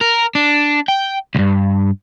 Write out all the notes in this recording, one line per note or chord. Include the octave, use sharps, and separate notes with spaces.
A#4
D4
G5
C2 G2